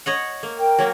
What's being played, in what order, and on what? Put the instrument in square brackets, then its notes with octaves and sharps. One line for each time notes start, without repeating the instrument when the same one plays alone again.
[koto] C#5 D#5 F#5
A#3
[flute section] A#4 G5
[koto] F#3 A#3